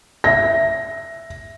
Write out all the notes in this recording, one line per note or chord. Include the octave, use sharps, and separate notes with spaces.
E5 A#6